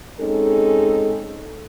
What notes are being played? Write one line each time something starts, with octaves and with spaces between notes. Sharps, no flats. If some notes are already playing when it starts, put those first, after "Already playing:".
G#3 C4 C#4 D#4 G#4 A4